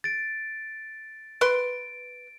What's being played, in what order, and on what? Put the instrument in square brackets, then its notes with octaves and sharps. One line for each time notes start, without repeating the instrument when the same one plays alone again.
[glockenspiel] A6 D7
[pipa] B4 C6 [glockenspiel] D7